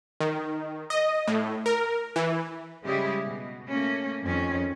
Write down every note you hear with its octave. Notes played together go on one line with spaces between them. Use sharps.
D#3
D#5
A2
A#4
E3
C#3 G3 G#3 E4 G4 G#4
B2
A3 A#3 C#4
F2 D#3 C#4